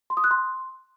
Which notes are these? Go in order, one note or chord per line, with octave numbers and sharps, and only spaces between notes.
C6
D#6
F#6
C6